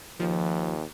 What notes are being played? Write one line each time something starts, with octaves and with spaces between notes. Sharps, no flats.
D#2 F3